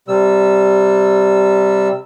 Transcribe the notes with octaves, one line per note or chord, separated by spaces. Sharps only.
C3 G3 E6